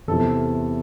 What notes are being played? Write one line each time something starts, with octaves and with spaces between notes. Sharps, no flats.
E2 C3 E3 A4